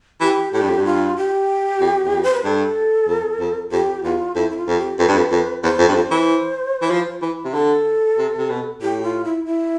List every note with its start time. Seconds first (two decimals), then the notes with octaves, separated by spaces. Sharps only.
0.21 E3 G4
0.53 A2 G4
0.62 G2
0.69 F2
0.78 G2
0.85 F4
1.17 G4
1.80 F2
2.05 E2
2.13 F2
2.23 C5
2.34 B4
2.44 G2 A4
3.08 F2
3.40 F2
3.72 F2 G4
4.04 E2 F4
4.35 F2 E4
4.51 E4
4.57 F4
4.67 F2
4.78 G4
4.99 F2 B4
5.08 G2
5.17 F2
5.31 F2
5.63 E2 C5
5.79 F2
5.89 G2
5.95 F2 C5
6.11 E3
6.82 E3
6.91 F3
7.22 E3
7.45 C3
7.54 D3 A4
8.18 C3
8.38 C3
8.50 B2
8.82 A2 G4
9.03 F4
9.24 E4
9.45 E4